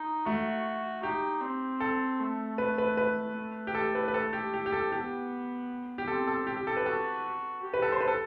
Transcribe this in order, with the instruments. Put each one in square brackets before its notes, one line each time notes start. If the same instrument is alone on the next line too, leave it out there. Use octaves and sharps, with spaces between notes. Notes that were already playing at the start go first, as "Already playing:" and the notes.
Already playing: [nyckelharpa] D#4
[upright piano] A3 [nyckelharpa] F#4
[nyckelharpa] D#4 [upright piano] G4
[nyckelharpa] C4
[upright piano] A4
[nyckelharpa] A3
[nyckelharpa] A3 [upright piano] B4
[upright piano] B4
B4
[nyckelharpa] A3
[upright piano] G4
A4
B4
B4
A4
G4
G4
G4
A4
[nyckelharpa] B3 [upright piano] G4
[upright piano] G4
[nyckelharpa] C4 [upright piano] A4
[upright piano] A4
G4
G4
A4
B4
[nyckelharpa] F#4 [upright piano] A4
[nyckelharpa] G4
[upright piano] B4
A4
C5
B4
A4